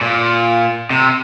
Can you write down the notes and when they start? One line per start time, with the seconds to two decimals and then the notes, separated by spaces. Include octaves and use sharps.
0.01 A#2
0.90 C3